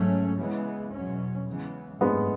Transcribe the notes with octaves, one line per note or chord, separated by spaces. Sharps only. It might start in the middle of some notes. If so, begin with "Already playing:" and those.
Already playing: G#2 F#3 A3 C#4
C#3 E3 G#3 B3
E2 B2 F#3 C#4
C#3 E3 G#3 B3
F#2 E3 G#3 A3 B3 C#4